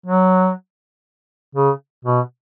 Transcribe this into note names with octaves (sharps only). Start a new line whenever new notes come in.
F#3
C#3
B2